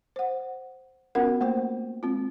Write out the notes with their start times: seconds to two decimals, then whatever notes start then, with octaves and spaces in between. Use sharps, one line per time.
0.16 C5 F#5
1.15 B3 C#4 F4 F#4 A#4 F#5
1.41 A3 A#3 C5 G5
2.03 G#3 C4 F4